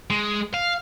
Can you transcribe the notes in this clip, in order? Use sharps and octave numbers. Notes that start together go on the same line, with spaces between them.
G#3
F5